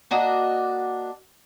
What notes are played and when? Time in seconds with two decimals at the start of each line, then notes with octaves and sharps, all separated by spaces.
0.11 A#3 D4 F#4 D#5